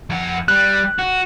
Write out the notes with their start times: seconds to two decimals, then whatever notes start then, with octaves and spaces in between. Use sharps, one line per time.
0.10 F2 F#5
0.48 G3 F#6
0.99 F#4